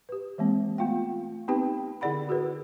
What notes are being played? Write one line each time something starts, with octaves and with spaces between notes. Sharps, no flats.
G4 B4
E3 G#3 A#3 C4
A3 B3 F4 F5 G5
B3 C4 D#4 G4 B4 G5
D3 E4 G#4 D5 F#5 B5
F#4 G#4 A#4 B4